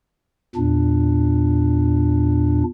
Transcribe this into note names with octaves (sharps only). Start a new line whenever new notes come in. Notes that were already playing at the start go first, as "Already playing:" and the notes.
E2 A#2 D4